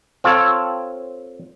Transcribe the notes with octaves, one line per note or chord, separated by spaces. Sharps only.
C4 F4 A4 C#5